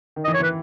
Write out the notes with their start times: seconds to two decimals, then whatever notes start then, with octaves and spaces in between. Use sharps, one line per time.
0.16 D#3
0.24 D#5
0.28 E3
0.34 C#5
0.39 E3
0.43 B4